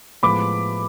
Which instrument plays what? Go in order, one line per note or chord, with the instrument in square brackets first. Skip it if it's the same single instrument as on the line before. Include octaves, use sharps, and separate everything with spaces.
[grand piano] A2 F3 G#3 B3 [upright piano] B5 D6